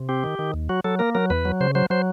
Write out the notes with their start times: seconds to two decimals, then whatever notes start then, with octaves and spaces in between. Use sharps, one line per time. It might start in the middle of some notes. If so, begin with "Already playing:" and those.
Already playing: C3
0.09 C4 G4
0.24 D#3
0.39 D#3
0.54 D#2
0.69 F#3 F#4
0.84 F#3 A4
0.99 A#3 A#4
1.15 F#3 A#4
1.30 E2 B4
1.45 F#3
1.60 C#3 C5
1.75 F#3 C5
1.90 F#3 C5